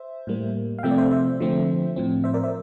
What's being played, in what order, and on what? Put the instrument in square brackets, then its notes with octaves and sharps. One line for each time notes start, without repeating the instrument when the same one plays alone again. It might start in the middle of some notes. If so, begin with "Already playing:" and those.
Already playing: [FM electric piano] C5 E5
A2 G3 A#3
F5
C3 F3 A3 C4 E5 G5
D5
C5 E5
C5 E5
D3 F3 A3 C4
A2 F3 C4
C5 E5
A#4 D5
C5 E5